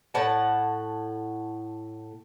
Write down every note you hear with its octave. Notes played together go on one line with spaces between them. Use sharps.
A2 F#5 A5